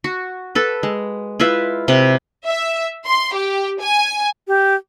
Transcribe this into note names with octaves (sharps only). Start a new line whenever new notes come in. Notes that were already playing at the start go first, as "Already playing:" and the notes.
F#4
A4 B4
G#3
E4 F4 B4 E5
C3 B4
E5
C6
G4
G#5
G4